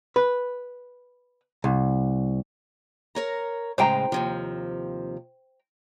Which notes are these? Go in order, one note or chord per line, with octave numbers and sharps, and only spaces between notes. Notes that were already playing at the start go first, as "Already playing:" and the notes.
B4
C2
A#4 C#5 A#5
A2 C#3 G#3 C5 G5 A#5
D#2 C3 F3